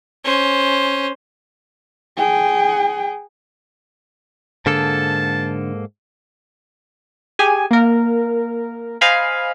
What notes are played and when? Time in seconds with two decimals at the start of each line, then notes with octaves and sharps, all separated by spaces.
0.24 C#4 C5
2.18 G#4 G5
4.66 G#2 D3 A#3 A4 A5
7.39 G4 G#4 G#5
7.71 A#3 A#4
9.01 C5 D#5 F5 G#5 B5